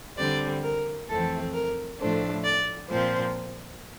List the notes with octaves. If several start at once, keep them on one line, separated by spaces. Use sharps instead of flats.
D3 G3 C4 D5
A#4
F2 E3 A3 C4 A4
A#4
A2 F3 A3 D4 C5
D5
A#2 F3 C4 C5